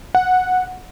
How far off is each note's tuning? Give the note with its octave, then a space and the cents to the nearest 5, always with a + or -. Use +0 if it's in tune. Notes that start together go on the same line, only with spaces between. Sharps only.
F#5 -10